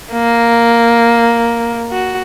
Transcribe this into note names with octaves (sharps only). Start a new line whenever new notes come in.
A#3
F#4